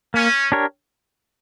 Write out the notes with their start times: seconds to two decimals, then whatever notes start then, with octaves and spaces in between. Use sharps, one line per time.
0.14 A#3 C#4
0.52 D4 G4 A#4 C#5